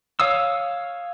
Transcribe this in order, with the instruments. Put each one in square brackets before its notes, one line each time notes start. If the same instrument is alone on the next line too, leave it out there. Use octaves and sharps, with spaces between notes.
[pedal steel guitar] C#5 F5 D#6 E6